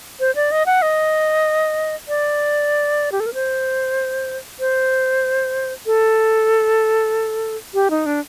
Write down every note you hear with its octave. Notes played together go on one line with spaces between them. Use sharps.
C5
D5
D#5
F#5
D#5
D5
G4
A4
A#4
C5
C5
A4
G4
D#4
D4